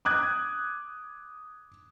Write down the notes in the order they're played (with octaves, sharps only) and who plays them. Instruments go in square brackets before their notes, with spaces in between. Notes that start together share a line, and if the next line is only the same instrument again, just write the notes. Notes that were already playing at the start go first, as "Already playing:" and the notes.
[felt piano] D6 D#6 F#6 G#6